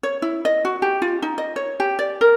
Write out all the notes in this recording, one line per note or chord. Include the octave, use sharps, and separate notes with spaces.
C#5
E4
D#5
F#4
G4
F4
D#4
D#5
C#5
G4
D5
A#4